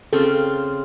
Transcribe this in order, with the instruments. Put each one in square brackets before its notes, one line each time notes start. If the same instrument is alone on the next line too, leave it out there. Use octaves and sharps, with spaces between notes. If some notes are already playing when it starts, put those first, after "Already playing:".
[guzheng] C#3 C4 F4 [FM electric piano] A4